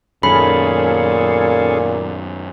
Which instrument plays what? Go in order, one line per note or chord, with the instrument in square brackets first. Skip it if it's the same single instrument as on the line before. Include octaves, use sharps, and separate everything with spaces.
[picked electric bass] F#2 D#3 [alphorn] A#2 [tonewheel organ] C#4 G#4 A4 [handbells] B5